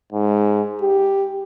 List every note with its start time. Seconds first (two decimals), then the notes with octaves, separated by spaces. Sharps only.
0.12 G#2
0.82 G4